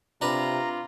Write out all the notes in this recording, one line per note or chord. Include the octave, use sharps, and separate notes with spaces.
C3 D4 F4 B4 A#5